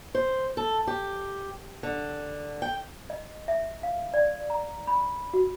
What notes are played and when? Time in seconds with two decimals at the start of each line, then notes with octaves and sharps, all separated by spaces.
0.15 C5
0.57 A4
0.87 G4
1.83 D3
2.62 G5
3.10 D#5
3.48 E5
3.83 F5
4.14 D5
4.50 A#5
4.87 B5
5.33 F#4